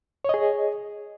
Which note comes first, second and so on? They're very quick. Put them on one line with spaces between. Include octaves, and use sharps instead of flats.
C#5 D#5 G#4